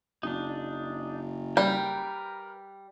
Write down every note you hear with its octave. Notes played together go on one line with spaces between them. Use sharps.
F#1 D4 D#4
G3 A#4 B4 G5